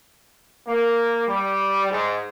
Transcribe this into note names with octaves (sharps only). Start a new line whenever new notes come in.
A#3
G3
G#2